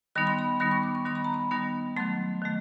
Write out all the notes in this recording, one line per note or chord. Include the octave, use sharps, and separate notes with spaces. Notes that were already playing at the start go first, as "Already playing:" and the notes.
D#3 G3 B3 D#4 B5
C6
B5
D#3 G3 B3 D#4 B5
C#6
D6
C#6
D#3 G3 B3 D#4 C6
B5
A#5
B5
D#3 G3 B3 D#4
D#3 F#3 A3 C6
D#3 F#3 A3